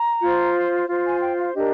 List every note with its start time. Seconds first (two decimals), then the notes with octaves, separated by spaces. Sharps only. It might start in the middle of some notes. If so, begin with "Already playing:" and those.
Already playing: A#5
0.21 F4 C5
0.88 F4 C5
1.05 G#5
1.21 G5
1.38 F5
1.55 D4 G4 A#4 D#5